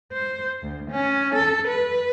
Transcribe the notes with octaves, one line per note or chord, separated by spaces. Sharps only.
C5
D2
C#4
A4
B4